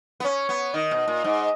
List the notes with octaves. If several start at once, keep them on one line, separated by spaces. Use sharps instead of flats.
B3
C#4 C#5
B3
D#3 D#5
B2
A#2
G#2